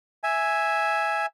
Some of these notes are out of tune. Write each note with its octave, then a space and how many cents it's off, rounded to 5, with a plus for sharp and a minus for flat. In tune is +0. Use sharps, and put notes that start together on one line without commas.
E5 +0 G#5 +0